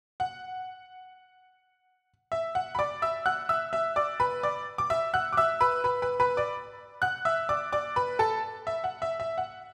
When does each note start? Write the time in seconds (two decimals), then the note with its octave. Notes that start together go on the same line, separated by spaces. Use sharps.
0.20 F#5
2.32 E5
2.55 F#5
2.75 B5
2.79 D5 D6
3.02 E5 E6
3.26 F#5 F#6
3.49 E5 E6
3.73 E5 E6
3.96 D5 D6
4.20 B4 B5
4.43 D5 D6
4.78 D6
4.90 E5 E6
5.14 F#5 F#6
5.33 D6
5.37 E5 E6
5.61 B4 B5
5.84 B4 B5
6.02 B4 B5
6.20 B4 B5
6.37 D5 D6
7.02 F#5 F#6
7.25 E5 E6
7.49 D5 D6
7.72 D5 D6
7.96 B4 B5
8.19 A4 A5
8.67 E5
8.84 F#5
9.02 E5
9.20 E5
9.38 F#5